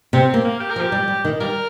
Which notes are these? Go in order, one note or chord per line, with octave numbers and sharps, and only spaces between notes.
C3 C4
A#3 C4
A#3
G4
A#4
F3
G4
G3
G3
D#3
G3 A#4